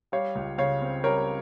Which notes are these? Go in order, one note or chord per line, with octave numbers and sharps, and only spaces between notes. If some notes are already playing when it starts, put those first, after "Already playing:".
G3 C#5 F5
C#2
C#3 C#5 F5
C4
G3 A#4 C#5